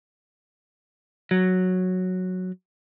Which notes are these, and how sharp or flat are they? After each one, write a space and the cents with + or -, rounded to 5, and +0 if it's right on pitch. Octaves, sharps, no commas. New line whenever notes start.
F#3 -5